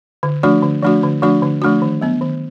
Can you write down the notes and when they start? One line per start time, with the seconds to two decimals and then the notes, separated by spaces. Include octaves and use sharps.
0.23 D3
0.43 F3 A3 D4 F#4
0.62 D3
0.83 F3 A3 D4 F#4
1.03 D3
1.22 F3 A3 D4 F#4
1.42 D3
1.62 F3 A3 D4 F#4
1.82 D#3
2.01 F#3 B3
2.21 D#3